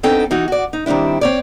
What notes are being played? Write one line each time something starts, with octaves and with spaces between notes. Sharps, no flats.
B3 C4 D4 D#4 A4 G5
E3 D#4 F#4
F#4 D5
D#4
D#3 G3 C4 D4 E4
C4 C#5 D5